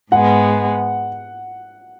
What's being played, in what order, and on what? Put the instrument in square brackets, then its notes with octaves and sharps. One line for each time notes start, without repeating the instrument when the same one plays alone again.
[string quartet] G#2 G#3 B3 [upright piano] F#5